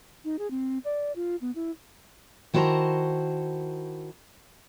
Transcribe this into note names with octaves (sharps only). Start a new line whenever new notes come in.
D#4
G#4
C4
D5
F4
B3
E4
D#3 E4 F#4 C5 A5 A#5